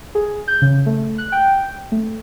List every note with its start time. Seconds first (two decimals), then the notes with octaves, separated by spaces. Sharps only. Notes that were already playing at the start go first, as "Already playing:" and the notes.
0.15 G#4
0.48 G6
0.62 C#3
0.86 A3
1.18 F#6
1.32 G5
1.92 A3